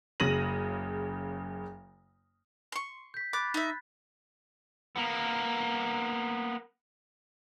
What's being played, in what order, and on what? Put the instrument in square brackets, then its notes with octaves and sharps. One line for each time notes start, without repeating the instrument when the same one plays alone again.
[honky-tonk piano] F#1 C#3 A#6 D#7 F#7
[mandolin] C6 C#6
[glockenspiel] G6 B6
[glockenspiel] B5 F#6 A6 [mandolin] D6
[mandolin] D#4 E5
[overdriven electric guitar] A#3 B3